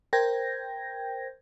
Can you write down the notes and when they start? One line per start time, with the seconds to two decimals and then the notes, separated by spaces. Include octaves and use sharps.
0.13 A#4 C5 G5 G6 G#6 A#6